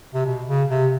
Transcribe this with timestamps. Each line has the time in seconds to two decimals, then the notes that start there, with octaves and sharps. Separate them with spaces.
0.14 C3
0.25 B2
0.48 C#3
0.70 C3